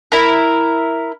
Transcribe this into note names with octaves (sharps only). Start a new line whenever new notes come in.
E4 A#4